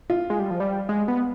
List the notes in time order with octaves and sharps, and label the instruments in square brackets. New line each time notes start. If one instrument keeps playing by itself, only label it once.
[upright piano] F4
[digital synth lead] G#3
G3
F3
G3
G#3
B3